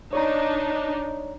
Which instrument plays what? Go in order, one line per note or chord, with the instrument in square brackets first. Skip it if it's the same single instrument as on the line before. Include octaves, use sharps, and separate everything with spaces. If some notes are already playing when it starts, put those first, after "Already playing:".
[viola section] D4 D#4 [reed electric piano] C#5 D5 A#5